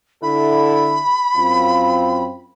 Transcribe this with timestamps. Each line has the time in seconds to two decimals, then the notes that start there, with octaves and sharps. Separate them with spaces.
0.23 D3 E4 A4 B5
1.36 F#2 C4 F4